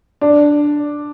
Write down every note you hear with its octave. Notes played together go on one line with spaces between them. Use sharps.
D4